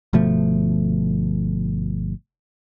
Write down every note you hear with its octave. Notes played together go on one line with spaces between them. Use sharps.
G1 B2 F3 A3